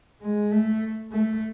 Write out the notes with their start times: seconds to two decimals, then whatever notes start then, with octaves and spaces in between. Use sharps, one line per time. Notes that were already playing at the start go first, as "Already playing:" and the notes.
0.22 G#3
0.52 A3
1.12 A3